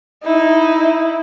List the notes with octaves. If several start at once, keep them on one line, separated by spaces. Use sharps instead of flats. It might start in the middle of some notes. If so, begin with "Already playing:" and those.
D#4 E4